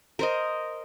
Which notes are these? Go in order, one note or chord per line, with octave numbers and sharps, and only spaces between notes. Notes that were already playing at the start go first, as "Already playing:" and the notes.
A#4 C5 D#5